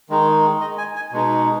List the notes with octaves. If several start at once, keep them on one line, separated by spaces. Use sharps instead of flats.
D#3 G#3 D#4
D#5
G#5
G#5
B2 G#3 D#4